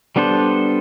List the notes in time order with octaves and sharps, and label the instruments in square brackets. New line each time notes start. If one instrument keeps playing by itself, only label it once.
[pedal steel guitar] G3 B3 D4 A4 C5